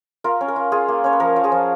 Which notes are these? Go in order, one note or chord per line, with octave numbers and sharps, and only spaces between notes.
F4 A#4
C#4
A#4
F4
F4 G#4
A#3
C#4 C#5
B4
F3 A#4
F3
G#4
F3